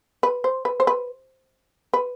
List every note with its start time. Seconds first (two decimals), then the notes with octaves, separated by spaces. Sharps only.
0.23 B4
0.44 C5
0.65 B4
0.80 C5
0.87 B4
1.94 B4